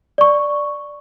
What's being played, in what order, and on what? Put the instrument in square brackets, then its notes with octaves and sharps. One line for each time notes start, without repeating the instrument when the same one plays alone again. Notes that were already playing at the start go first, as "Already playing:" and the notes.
[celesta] D5 C#6